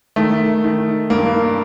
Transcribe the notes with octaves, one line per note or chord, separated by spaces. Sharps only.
D#3 A3
D#3
G2 A#3